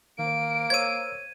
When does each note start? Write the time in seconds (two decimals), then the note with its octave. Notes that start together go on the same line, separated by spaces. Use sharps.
0.19 D#3 A#3 D7
0.70 C5 C#5 E6 G#6 D#7